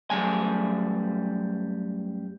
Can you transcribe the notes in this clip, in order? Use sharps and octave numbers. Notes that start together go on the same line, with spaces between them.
F#2 D#3 G3 A3 G#5